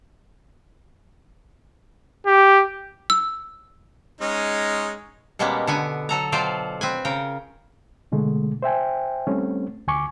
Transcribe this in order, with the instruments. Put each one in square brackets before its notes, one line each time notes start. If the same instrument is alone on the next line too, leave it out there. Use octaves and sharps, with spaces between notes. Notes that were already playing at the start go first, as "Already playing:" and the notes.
[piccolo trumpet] G4
[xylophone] E6
[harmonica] G#3 C#4 D#4
[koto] B2 G3 G#3 A#3 B3 C#4
D3 B3 G#5
F#3 A4 A#5
B2 F#3 F4 C5 D5 G5
C4 B4 G#5
C#3 A#4 G5
[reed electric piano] B2 D3 G#3 A3
C5 E5 G5 G#5
G3 A3 C4 C#4
D2 G#5 C#6 D6